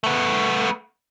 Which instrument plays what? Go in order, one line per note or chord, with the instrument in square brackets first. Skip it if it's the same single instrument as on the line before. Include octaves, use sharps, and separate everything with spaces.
[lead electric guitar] A3 B3